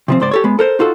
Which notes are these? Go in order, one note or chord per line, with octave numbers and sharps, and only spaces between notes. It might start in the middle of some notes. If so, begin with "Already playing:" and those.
C3 F3 C4
C#2 G#2 C5 D5
G4 A4 C#5
G#3 B3
A4 A#4 C5
D#4 F4 F#4 A4